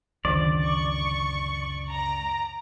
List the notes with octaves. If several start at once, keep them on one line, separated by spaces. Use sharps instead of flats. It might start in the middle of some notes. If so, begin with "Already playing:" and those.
C#2 F#2 D3 D#3 D5
C#6
A#5